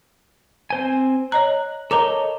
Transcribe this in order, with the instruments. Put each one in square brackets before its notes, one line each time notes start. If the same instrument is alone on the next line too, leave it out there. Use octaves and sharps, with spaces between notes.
[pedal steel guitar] C4 C5 G#5
[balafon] C#5 D#5 A#5 [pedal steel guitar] F#6
[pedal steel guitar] A4 C#5 D#5 [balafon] A#4 A#5 D6